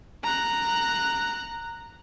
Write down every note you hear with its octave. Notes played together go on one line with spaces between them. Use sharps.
A#5 F#6